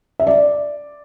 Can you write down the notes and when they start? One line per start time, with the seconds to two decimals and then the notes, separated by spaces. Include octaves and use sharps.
0.20 E5
0.27 D5